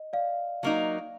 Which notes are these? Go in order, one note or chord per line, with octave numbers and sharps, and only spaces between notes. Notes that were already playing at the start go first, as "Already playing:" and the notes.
Already playing: D#5
D5 F5
F#3 A#3 D#4